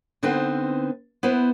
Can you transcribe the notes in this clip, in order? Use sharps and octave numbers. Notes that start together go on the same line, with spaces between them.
D3 B3 C4 D#4 B4 C5
B3 E4 B4 C5